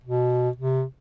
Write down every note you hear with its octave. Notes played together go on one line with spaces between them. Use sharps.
B2
C3